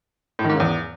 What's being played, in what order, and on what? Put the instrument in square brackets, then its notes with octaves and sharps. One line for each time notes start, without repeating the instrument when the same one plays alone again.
[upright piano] A2
D#3
G#2
C#3
E2